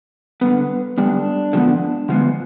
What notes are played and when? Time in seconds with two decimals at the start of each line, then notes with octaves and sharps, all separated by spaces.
0.41 D3 G3 B3 B4
0.98 D3 G3 B3 D4
1.53 D3 F3 G#3 B3
2.09 D3 F3 G#3 B3